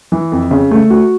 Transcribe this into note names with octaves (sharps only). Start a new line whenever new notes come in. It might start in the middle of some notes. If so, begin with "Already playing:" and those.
E3
F2
C#3
A3
F#4